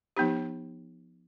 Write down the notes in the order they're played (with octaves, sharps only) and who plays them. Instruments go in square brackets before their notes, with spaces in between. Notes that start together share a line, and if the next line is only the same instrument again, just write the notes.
[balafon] F3 B3 D#4 G4